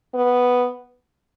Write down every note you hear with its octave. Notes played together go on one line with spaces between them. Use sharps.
B3